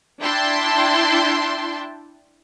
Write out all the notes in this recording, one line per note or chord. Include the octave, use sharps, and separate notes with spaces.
D4 E4 G5 A5 C6